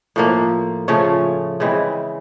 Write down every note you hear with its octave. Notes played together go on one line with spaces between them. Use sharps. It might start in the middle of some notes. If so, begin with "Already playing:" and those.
A2 F3 A#3
C#3 F3 A3 C#4
C#3 E3 G#3 C4